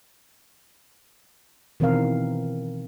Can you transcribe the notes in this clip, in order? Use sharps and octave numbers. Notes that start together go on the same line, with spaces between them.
B2 D#3 E3 C4 A#4 F5